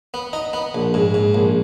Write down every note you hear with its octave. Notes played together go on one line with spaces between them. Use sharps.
B3
D#4
B3
A#1
G#2
G#2
A#1